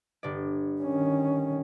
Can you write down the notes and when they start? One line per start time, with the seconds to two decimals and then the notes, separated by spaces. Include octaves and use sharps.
0.23 G1 D5
0.82 D#3 C#4